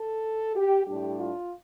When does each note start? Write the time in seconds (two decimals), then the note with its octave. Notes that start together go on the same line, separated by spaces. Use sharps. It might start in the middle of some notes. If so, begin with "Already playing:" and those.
Already playing: A4
0.56 G4
0.86 A2 G3 D4 G4
1.19 F4